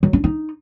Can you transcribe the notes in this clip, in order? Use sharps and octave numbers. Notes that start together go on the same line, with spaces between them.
F#3
D4
D#4